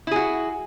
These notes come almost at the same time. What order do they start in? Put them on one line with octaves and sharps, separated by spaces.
E4 G#4 F#4